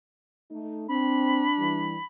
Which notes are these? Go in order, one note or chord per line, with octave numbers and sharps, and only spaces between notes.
A3 D#4
C4 D4 B5
E3 G3